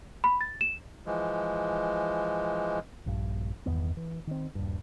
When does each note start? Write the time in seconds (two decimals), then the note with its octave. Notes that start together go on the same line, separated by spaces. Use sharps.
0.24 B5
0.41 A6
0.61 E7
1.06 E3 F3 G#3
3.06 A#1 G2
3.66 G1 E2 D#3 B3
3.97 E3
4.27 D#3 C4
4.55 D#1 G2